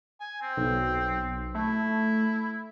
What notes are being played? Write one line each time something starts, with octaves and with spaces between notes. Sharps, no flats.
G#5
C4
B1
A3 E4